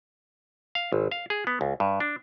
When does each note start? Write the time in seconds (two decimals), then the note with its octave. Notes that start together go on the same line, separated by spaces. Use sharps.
0.75 F5
0.92 G#1
1.11 F5
1.30 G#4
1.47 B3
1.61 C#2
1.80 G2
2.00 D4